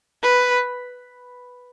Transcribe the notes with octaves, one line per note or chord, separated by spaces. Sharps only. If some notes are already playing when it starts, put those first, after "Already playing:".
B4